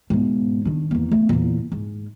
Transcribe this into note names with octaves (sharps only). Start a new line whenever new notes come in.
G#2 B2
D#3 D4
E2 A#3
A3 B3
E2 A#2
G#2